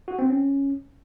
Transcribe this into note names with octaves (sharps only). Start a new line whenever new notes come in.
F#4
C4
C#4